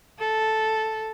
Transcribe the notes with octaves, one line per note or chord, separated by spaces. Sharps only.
A4